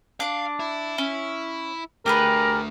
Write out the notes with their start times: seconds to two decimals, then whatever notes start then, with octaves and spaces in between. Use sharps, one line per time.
0.20 D4 F5 D6
0.60 E4
0.98 C#4
2.06 D3 A3 G4 G#4 A#4 B4